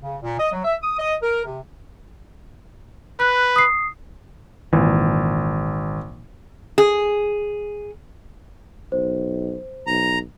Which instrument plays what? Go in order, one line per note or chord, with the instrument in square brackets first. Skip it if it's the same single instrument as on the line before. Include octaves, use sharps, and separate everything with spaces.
[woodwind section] C#3
A#2
D#5
F#3
E5
D#6
D#5
A#4
C3
[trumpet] B4 [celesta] F#6
[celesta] D#6 C7
[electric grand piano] G#1 [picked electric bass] A#2 E3
[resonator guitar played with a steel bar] G#4
[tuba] B1 [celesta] C5
[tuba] B1 [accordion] A#5